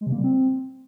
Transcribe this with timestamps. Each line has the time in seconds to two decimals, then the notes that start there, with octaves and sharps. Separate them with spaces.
0.01 G#3
0.07 C3
0.12 A#3
0.18 G3
0.24 C4